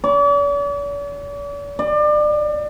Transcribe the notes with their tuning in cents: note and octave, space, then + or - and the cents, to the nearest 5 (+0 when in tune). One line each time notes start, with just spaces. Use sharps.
D5 -45
D5 +30